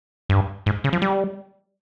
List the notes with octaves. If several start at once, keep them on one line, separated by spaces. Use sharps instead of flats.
G2
G#2
C#3
F3
G3